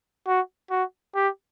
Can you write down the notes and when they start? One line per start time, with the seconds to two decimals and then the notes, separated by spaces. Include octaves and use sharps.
0.27 F#4
0.71 F#4
1.15 G4